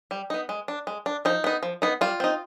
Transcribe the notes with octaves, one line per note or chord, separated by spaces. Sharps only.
G3
B3 D#4
G#3
D4
G#3
D4
F3 D#4
B3 D#4
F3
B3 D#4
G3 F4
C4 D#4